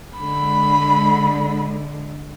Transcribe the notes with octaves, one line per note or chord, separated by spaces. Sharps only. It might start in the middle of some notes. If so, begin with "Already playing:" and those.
D3 G#3 B5